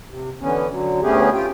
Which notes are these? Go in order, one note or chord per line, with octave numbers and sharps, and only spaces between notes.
C3
D3 E3 B3 C#4
D3 F#3
D2 A3 B3 C#4 G4 G#4
F4 G4 G5